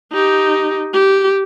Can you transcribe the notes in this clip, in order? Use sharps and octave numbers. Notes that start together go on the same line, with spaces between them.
D#4 G4
G4